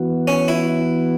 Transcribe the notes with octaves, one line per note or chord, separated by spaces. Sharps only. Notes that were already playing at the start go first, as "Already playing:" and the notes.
Already playing: E3 B3 F#4
C#4
E4